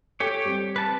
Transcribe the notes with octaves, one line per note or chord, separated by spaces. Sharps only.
G4 A4 C#5
G3 C4
B4 A5